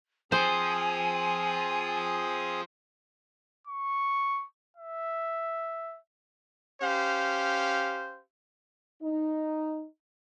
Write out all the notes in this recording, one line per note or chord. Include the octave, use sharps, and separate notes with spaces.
F3 C4 G#4 C5 G#5 D#6
C#6
E5
C#4 G4 C5 F5
D#4